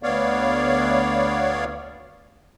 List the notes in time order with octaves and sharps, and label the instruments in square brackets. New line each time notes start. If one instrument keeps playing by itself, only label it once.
[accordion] D2 B3 C#5 D5 F5